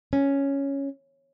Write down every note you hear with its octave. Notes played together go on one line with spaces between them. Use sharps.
C#4